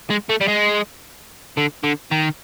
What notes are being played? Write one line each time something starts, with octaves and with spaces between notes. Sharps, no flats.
G#3
A3
G3
G#3
D3
D3
D#3